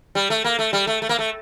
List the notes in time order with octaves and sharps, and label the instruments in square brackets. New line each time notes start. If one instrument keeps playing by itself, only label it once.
[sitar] G3
A3
A#3
A3
G3
A3
A3
A#3
A3